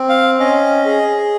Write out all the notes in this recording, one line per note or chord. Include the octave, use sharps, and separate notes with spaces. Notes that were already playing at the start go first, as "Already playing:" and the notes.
Already playing: C4
F5
C#4 D#5
G#4